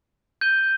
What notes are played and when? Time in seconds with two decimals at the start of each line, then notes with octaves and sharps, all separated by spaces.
0.41 G6 D#7 G7